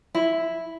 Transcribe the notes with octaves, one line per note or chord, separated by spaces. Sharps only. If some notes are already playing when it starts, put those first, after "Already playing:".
E4